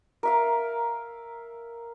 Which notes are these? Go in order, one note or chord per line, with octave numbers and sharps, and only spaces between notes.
A#4 E5 F5